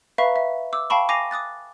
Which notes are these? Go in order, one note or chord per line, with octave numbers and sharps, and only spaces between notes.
B4 E5 F5 A#5 B5 C#6
E5
D6 E6
F5 G5 A5 B5 C#6
G#5 D6 A#6 C7 D#7 F7
D6 D#6 F#6 A6